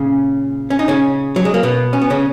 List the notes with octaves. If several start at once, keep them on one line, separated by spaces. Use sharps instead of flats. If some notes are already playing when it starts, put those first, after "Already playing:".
Already playing: A#2 C#3 C#4
C#4
D#4
C#3 C#4
F#3
G#3
A#3
B2 B3
C#4
B3
C#3 C#4